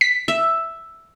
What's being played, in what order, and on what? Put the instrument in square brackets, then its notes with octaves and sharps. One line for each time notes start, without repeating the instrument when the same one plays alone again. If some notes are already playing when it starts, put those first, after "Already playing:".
[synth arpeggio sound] B6
[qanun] E5